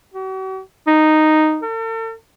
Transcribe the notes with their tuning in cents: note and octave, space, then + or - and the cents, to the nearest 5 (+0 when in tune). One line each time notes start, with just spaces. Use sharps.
F#4 +45
D#4 -5
A4 +45